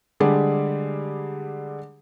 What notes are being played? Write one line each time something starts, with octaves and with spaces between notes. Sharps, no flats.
D3 G3 G#3 G4 G#4 D5